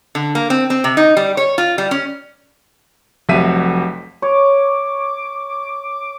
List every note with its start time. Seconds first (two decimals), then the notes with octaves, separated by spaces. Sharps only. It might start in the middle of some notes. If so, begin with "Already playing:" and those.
0.15 D3
0.35 A#3
0.50 C4
0.70 C4
0.84 C3
0.97 D#4
1.17 G3
1.37 C#5
1.58 F4
1.78 G3
1.91 C#4
3.29 F1 F2 F#3 E5 B6 D#7
4.22 C#5 D6